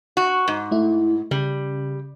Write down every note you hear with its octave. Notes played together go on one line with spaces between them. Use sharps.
F#4
G#2
A3 E4
C#3 G3